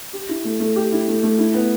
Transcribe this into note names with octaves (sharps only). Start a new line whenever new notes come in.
G4
E4
A3
A3
G4
E4
A3
A3
E4
B3